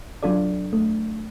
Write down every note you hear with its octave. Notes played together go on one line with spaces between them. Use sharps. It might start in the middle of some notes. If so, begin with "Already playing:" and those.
F#3 D4 F4 A4 D5
A3